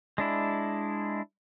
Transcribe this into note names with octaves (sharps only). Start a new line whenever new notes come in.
G#3 D4 E4